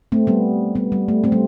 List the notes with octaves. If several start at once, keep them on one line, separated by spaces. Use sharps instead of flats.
A3 C4
G3 B3
G3 B3
G3
A3
A3 C4
G3